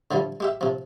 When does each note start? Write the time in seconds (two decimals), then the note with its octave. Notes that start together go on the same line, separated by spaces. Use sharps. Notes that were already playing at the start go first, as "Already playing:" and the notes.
0.11 D3 E3 F3 G3
0.40 G#3 G4 E5
0.61 C3 F3